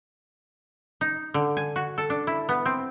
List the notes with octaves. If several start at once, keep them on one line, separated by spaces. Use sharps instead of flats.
D#4
D3
G#5
F#4
A4
D4
E4
B3
C4